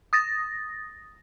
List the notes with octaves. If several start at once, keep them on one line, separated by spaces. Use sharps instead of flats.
D#6 A6 A#6